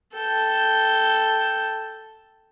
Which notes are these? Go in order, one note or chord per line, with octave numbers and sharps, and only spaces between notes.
A4 G5